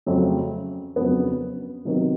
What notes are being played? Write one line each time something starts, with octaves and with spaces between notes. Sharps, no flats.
F2 C#3 F#3 A3 C4
F2 C#3 F#3 B3 D4
C3 D#3 F#3 B3 D#4